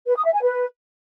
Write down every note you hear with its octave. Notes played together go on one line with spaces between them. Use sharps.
B4
D#6
E5
G#5
B4